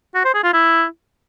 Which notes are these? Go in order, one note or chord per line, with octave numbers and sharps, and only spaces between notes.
F#4
C5
G#4
F4
E4